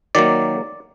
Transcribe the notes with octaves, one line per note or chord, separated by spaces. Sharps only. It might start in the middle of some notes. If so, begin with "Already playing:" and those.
D#3 F#3 A#3 D5